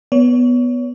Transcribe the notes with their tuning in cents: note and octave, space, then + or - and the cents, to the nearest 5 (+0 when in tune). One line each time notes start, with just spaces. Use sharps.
B3 +0 C#5 +30